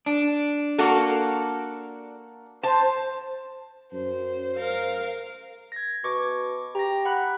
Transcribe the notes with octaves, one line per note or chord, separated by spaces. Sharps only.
D4
A#3 F#4 A4
C5 A5
F#2 C5
A#4 F5
G#6 A#6
B2 C#6 D6
G4 A#5 A#6
F#5 B5 F#6